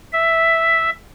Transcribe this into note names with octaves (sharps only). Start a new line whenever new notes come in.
E5